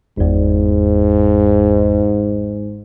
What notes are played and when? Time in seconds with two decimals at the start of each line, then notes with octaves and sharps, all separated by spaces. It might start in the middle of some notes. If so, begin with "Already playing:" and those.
0.18 G1 E2 G#2